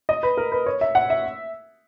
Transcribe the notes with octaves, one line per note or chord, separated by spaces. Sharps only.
D#5
B4
A#4
B4
C#5
E5
F#5
E5